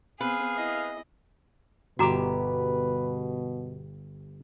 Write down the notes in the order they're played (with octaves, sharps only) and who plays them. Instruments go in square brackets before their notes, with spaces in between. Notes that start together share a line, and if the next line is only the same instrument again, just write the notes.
[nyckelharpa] B3 C4 [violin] G#4 [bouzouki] B4 [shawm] F5
[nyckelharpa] E4 D#5
[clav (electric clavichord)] G1 G4 [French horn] B2 [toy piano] F#4 A#5 D6 [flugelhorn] B4